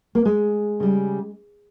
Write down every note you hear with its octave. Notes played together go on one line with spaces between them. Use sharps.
A#3
G#3
C#3 G3